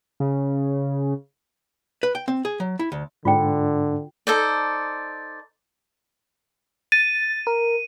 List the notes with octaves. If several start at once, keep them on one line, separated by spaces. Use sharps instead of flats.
C#3
B4
G5
C4
G#4
F#3
E4
D2
G#2 D3 D4 F4 G5
D#4 A4 C5 D5
A6 D#7
A#4